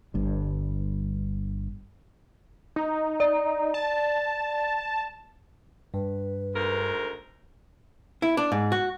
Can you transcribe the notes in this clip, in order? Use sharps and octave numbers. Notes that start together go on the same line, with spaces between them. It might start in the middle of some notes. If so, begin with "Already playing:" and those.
G1 G2 D3
D#4
D5
A5
G2 B4
D2 G#2 A#4
E4
D4
G#2
F#4